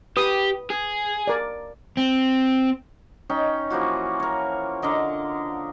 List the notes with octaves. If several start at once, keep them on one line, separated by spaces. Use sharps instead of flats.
G4 B4 D#6
G#4
A#4 D5
C4
C#4 D#4 G5
E3 F3 A#3 F#4
A#4 C#5
D3 A#4 D#5 D6